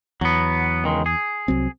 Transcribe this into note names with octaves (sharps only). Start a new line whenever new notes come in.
E2 F#3 B3
C#2 D#3 G#3
G#4
C2 F#3 C4